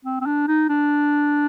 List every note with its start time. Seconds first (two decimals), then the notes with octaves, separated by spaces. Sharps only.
0.05 C4
0.21 C4
0.26 D4
0.47 D#4
0.69 D4